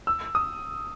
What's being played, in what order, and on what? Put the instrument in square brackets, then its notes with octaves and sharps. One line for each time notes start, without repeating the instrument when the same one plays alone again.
[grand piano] E6
D#6